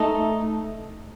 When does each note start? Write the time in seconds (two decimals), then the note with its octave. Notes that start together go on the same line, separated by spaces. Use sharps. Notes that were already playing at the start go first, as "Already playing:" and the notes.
Already playing: A3 D#4 A4